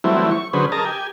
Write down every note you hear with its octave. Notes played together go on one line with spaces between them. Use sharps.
E3 F#3 G3 A3 C4 E4
C#6
D3 F#3 C#4 G#4 B4 C5
G#4 A#4 D#5 A5 A#5
G4 G#5